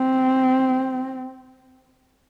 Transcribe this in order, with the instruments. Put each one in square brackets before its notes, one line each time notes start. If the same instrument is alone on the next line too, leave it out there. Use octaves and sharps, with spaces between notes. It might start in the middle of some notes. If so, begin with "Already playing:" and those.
Already playing: [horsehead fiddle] C4